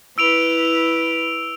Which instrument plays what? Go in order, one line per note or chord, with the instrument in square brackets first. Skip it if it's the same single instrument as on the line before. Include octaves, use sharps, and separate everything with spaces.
[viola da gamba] E4 B4 [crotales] E6 D7 F7